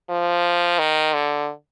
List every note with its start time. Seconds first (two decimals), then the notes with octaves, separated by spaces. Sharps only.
0.10 F3
0.79 D#3
1.14 D3